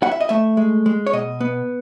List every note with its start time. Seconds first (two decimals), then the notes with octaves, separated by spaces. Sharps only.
0.02 E4 F#5
0.11 E5
0.20 D#5
0.29 A3 E5
0.57 G#3
0.86 G#3
1.07 C#5
1.13 B2 D#5
1.41 B3